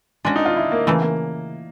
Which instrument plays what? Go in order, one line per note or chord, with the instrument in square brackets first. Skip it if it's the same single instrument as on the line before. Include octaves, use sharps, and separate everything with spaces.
[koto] G#3 C#4 F#4 [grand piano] D4
[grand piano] D#4
F4
E4
A#3
[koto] C#3 E3 A3 [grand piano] A#3
[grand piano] A#3